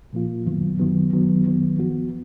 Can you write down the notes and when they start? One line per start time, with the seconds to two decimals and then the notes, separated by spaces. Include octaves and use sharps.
0.13 A#2 F3 A#3 F4
0.46 F#2 D#3 F#3 B3
0.79 F#2 D#3 F#3 B3
1.12 F#2 D#3 F#3 B3
1.46 F#2 D#3 F#3 B3
1.78 F#2 F3 B3 F#4